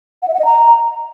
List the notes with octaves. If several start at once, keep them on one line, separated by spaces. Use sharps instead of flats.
F#5
E5
F#5
D#5
A#5